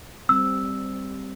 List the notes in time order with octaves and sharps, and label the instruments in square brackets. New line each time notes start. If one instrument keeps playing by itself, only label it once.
[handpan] G3 C4 [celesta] E6